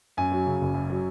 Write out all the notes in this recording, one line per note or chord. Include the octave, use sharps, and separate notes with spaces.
F#2 G#5
F#3
C#3
F#1
F#2
F#3